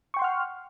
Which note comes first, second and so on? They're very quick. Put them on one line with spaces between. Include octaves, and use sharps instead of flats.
C#6 G5 C6 F#5 F6